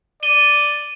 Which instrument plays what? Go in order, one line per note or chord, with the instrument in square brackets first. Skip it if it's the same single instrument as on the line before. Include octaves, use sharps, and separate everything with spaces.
[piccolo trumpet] D5 [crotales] D#7 G7